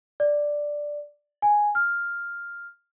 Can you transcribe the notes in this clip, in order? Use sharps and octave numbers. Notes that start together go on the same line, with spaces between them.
D5
G#5
F6